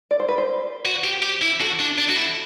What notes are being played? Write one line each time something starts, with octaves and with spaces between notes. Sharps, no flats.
D5
C5
B4
C5
F#4
G4
G4
E4
F#4 A4
D4
D4
F#4
E4